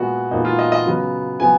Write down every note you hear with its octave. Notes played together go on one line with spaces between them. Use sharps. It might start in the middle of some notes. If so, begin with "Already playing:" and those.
Already playing: A#2 G#3 B3 F#4
A#2 G#3 B3 D#4
F4
D#5
D#5
C#3 F#3 B3
C#3 F#3 B3 G#5